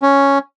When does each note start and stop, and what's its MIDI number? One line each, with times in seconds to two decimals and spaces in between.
0.02 0.38 61